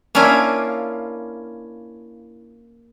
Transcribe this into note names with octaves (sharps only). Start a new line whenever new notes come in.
A#3 C#4 D4 E4 F4